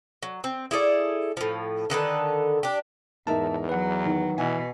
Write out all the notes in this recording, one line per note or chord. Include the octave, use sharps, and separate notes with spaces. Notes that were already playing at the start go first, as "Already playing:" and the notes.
F#3
C4
E4 G#4 A4 D5
A2 F3
D3 D#3 A4 B4
D4 G4
E2 G#2 D#4 A#4 E5 A5
F#3 B4 F#5
D#3
B2 E3 G#5